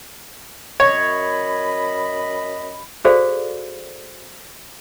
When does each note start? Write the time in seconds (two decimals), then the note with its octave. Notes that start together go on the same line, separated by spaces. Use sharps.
0.80 F#2 C#5 D#5 B5
3.05 F#4 G#4 A4 C5 D5 F5